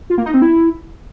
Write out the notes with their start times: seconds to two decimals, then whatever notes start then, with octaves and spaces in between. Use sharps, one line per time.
0.10 F4
0.18 A#3
0.26 D#4
0.34 C4
0.42 E4